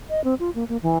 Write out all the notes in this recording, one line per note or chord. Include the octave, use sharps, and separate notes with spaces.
D#5
C4
F4
A#3
A#3
E3